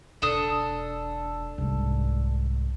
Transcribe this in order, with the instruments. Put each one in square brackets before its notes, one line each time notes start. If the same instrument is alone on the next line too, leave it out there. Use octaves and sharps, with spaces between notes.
[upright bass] E1 [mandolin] D4 A4 D#6
[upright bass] C2 G#2